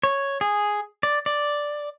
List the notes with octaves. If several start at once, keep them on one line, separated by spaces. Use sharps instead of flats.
C#5
G#4
D5
D5